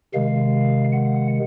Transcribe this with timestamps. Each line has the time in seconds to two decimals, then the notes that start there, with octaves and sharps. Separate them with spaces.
0.14 C3 D#3 G#3 F5
0.93 F#5